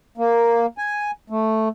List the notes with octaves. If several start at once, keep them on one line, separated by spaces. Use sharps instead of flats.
A#3
G#5
A3